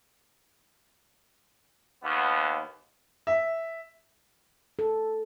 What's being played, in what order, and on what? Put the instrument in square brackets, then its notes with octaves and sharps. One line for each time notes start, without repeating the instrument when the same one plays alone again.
[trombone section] D#2 B3
[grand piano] E5
[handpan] A4